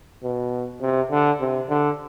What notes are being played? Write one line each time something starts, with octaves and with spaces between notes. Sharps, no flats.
B2
C3
D3
C3
D3